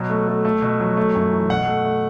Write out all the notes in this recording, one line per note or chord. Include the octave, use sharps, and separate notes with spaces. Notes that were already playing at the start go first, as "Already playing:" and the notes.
Already playing: B2 F#3
A3
A3
A3
B2
F#3
A3
F#2
E3
B2 F#5
A3
A3